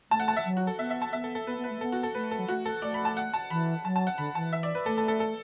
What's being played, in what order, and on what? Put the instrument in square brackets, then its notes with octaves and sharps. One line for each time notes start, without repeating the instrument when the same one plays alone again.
[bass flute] A3 [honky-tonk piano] A5
[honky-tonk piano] F#5
A5
E5
[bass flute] F#3
[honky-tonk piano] F#4
A4
[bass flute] B3 [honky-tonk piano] E5
[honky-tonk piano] E5
A5
[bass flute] B3 [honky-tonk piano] E5
[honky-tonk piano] A4
A4
[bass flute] B3 [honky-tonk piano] B4
[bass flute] B3
[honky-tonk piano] B4
[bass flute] A3
[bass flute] B3 [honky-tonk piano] A4
[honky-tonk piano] F#4
A4
[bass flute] A3 [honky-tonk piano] B4
[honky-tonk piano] A4
[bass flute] F#3
[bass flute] A3 [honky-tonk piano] F#4
[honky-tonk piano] A4
[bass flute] A3 [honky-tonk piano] D5
[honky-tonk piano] B5
A5
F#5
A5
[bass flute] E3 [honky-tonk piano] B5
[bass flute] F#3 [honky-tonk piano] A5
[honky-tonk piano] A5
F#5
[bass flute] D3 [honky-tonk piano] B5
[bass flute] E3 [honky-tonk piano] A5
[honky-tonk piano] E5
D5
B4
[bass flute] A3 [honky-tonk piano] A4
[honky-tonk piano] A4
A4
A4